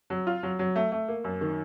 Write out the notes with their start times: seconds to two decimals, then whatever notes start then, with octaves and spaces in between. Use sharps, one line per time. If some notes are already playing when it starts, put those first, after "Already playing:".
0.10 F#3
0.27 F4
0.43 F#3
0.59 F#3
0.76 A3
0.92 A3
1.08 A#3
1.24 F#2
1.41 D#3